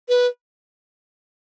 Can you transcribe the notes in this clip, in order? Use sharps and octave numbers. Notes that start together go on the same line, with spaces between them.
B4